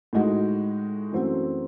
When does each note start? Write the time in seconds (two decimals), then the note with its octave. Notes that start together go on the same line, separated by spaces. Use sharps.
0.13 A2 G#3 D#4 F#4
1.12 F#2 E3 A3 C4 F#4